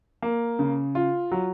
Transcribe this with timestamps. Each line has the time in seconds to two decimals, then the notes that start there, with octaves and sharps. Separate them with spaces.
0.22 A#3
0.59 C#3
0.95 F4
1.32 F#3